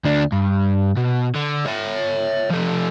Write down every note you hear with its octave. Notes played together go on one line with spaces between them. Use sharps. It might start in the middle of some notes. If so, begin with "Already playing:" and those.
D2 D4
G2
B2
D3
C#5 E5
F3 A3